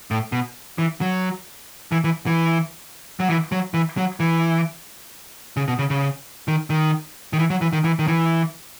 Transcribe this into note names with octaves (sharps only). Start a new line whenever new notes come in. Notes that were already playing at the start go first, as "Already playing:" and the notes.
A2
B2
E3
F#3
E3
E3
E3
F#3
E3
F#3
E3
F#3
E3
C#3
B2
C#3
C#3
D#3
D#3
D#3
E3
F#3
E3
D#3
E3
D#3
E3